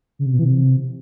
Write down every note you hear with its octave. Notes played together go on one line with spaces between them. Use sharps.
C#3
C3
B2
E3
C3